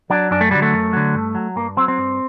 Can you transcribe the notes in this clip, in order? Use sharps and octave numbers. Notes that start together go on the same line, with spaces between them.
F#3 D4
F#2 D4
A3
D3 F#3 G3
A3
F#2
D3 F#3
G2
F#3
G2 A#3
F#3 C4
C4
G2